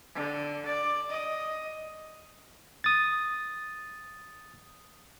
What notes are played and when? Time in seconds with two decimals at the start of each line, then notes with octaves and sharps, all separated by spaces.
0.15 D3
0.66 D5
1.10 D#5
2.84 D#6 A6